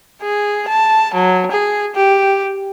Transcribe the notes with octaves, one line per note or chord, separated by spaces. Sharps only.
G#4
A5
F#3
G#4
G4